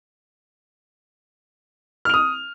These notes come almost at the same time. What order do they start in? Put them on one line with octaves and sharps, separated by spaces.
F6 F7 D#6